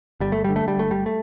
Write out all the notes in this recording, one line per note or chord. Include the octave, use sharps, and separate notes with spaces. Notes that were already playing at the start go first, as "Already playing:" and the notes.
G1 G3
A3
D3 G3
A3
G3
G1 A3
G3
A3